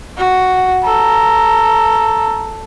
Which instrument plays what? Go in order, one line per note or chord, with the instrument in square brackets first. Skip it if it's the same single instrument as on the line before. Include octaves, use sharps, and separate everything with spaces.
[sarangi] F#4
[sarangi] A4 [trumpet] A#5